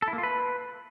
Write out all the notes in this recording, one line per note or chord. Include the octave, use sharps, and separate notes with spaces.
A4
E4
A#3
F4
B4